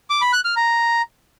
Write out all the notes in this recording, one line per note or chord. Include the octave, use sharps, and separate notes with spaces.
D6
B5
F#6
F6
A#5